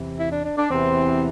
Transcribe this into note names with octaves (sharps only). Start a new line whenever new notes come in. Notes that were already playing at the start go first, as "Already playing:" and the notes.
Already playing: E2 C3 E3
E4
D4
D4
D4
E2 C3 E3 C4